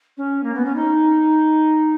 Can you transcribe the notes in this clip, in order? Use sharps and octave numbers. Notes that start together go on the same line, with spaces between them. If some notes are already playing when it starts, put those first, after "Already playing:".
C#4
A#3
B3
C#4
D#4